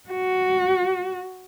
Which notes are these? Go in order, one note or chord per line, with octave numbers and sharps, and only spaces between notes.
F#4